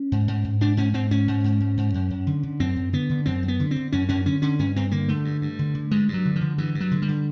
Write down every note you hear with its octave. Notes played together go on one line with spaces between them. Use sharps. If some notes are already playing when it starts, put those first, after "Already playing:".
Already playing: C#4
G#2
G#2
G#2
G#2 D4
G#2 C#4
G#2 C4
G#2 C#4
G#2
G#2
G#2
G#2
F#2
F#2
D3
D3
F#2 C4
F#2
D3 B3
D3
F#2 C4
F#2
B3
D3
C4
D3
F#2 C#4
F#2 C#4
D3 C#4
D3 C#4
G2 C#4
G2 C4
D3 A#3
D3 A3
G2
G2
D3
D3
G2 G#3
G2
F#3
D3
D3 F3
G2 E3
G2
F#3
D3
G3
D3